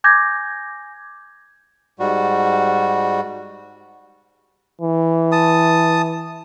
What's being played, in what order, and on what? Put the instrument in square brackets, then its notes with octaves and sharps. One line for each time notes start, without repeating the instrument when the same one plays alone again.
[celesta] G#5 D6 G6 G#6 A#6
[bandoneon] G#2 G3 F#4
[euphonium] E3
[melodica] A5 D#6